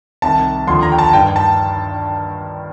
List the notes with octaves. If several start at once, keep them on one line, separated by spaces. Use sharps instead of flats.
C2 C3 D#3 A5
D#2 D3 F3 C6
A#5
G5
A5
G2 D#3 G5
A5